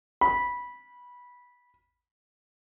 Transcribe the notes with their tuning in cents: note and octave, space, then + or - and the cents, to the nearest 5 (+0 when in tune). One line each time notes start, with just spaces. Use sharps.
B5 -15